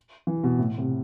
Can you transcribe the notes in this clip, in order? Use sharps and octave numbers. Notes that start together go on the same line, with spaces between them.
E3
B2
A2
C3